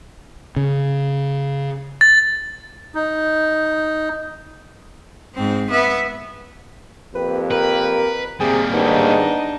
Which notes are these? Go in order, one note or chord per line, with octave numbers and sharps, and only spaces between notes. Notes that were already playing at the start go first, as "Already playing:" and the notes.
C#3
A6
D#4
G#2 C4
B3 E5
F2 A#3 G4 B4
A#4 B4
C3 G3 A#3 G#4
D#2 G#2 B3 D4 D#4